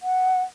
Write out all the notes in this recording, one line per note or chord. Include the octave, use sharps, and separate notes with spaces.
F#5